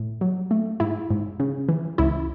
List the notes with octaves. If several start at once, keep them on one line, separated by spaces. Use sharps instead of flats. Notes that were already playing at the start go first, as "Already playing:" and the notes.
Already playing: A2
F#3
A3
G#2 E4
G#2
C#3
E3
C#2 E4